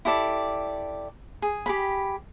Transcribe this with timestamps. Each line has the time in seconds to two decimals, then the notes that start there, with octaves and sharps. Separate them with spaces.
0.05 E4 G4 A4 D5
1.42 G#4
1.66 G4 G#4 B5